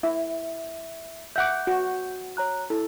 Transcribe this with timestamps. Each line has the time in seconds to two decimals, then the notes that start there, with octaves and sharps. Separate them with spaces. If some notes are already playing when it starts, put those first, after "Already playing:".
0.03 E4 E5
1.36 E5 F#5 D6 G6
1.67 F#4
2.37 C#5 A#5 F#6
2.70 E4 A4